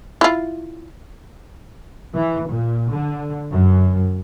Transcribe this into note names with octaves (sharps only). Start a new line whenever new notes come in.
E4 F4
E3
A#2
D3
F#2